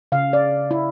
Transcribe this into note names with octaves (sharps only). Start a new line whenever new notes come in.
C#3 F5
D5
E4